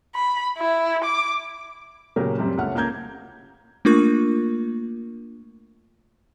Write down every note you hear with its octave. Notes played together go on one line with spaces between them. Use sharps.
B5
E4
D6
A#2 C#3 F#3 G4 A#4
F#2 G3 C4
C#2 A3 C#5 F#5 F6
C#2 A#3 A#5 G6 G#6
A3 A#3 D4 F4 A#4 C#6